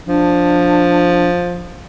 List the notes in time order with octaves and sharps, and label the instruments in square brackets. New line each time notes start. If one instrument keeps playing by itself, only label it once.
[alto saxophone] F3 [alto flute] D4